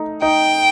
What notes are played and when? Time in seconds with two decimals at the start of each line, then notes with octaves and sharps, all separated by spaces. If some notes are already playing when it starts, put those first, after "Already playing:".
Already playing: A3 D#4
0.22 D#4 G5